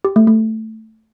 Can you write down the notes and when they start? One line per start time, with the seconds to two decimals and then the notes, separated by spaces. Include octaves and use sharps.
0.05 G4
0.16 A3
0.27 A3